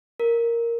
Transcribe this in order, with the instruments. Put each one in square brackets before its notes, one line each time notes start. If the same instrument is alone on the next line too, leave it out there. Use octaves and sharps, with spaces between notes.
[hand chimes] A#4